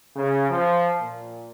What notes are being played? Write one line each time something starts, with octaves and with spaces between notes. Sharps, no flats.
C#3
F3
A#2